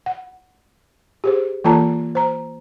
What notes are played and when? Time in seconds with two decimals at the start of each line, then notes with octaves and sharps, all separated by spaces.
0.06 F#5
1.24 G4 G#4 C5
1.64 E3 A#3 F4 A4 A5 A#5
2.15 C5 A#5